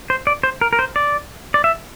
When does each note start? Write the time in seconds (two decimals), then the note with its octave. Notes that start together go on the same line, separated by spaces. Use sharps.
0.10 C5
0.27 D5
0.43 C5
0.61 A#4
0.73 A#4
0.79 C5
0.96 D5
1.54 D5
1.64 E5